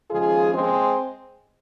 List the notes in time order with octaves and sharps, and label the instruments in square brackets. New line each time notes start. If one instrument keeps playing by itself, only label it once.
[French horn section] D#2 C#3 F3 G#3 F4 G#4
G#3 C4